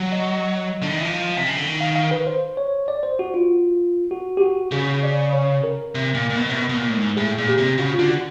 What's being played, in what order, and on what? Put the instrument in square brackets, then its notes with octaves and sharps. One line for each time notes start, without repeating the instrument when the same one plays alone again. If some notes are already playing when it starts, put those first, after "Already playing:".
Already playing: [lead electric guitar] F#3
[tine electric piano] D#5
[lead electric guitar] D3
D#3
E3
F3
C3
C#3
D3
D#3
[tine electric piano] F5
F5
B4
C5
C#5
D5
C5
F#4
F4
F#4
G4
F#4
[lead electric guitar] C#3 [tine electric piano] G#4
[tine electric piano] D5
C#5
A#4
[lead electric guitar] C3
A#2
A#2
B2
C3
B2
B2
A#2
A2
G#2
[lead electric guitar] A2 [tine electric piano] G#4
[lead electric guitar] A#2
[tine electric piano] G4
[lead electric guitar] C3
[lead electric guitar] C#3 [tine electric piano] F#4
[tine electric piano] F4
[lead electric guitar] D3
[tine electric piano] F#4